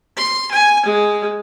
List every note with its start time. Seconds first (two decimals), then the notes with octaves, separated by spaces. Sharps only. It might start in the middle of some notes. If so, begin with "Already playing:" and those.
0.17 C6
0.52 G#5
0.86 G#3